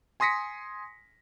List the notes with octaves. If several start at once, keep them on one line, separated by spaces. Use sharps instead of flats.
G#5 C6 D#6 A#6 B6 C#7